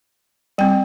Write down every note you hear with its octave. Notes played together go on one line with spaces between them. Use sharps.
G3 C4 G5